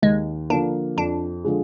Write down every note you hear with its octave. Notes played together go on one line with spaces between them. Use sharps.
D#2 G#3
D3 F3 A#3 D4
F2 D4
D3 F3 G#3